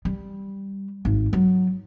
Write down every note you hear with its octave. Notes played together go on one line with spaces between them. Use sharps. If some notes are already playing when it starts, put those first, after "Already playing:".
G3
G#1
F#3